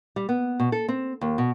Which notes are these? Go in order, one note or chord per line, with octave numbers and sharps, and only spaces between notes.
G3
B3
B2
A4
C4
D#2
B2